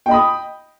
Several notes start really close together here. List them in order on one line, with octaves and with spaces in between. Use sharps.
G5 D#5 B5 D#6